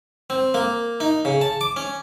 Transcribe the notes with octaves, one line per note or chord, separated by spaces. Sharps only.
C4
A#3
D#4
C#3
A5
D6
C#4